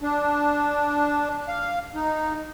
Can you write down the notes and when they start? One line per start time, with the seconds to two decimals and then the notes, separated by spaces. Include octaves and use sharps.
0.01 D4
1.48 F5
1.95 D#4